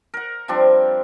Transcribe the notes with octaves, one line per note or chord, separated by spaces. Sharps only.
A#4 F#5
F3 G3 C4 D4